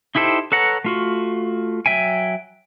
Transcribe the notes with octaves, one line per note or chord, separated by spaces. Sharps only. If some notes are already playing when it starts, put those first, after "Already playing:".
D#4 E4 G4 A4 C5
A4 B4 C#5 F#5 A#5
A3 F4 F#4
F#3 E5 G5 G#5